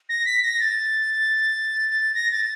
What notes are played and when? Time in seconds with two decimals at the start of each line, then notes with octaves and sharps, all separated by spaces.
0.09 A#6
0.26 B6
0.43 A#6
0.60 A6
2.15 A#6
2.31 A6